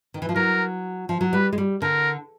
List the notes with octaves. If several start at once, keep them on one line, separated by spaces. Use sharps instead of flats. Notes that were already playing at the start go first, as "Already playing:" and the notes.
D#3
E3
F3
F#3 A#4
F3
F#3
G3 B4
G#3
G3
D3 A#4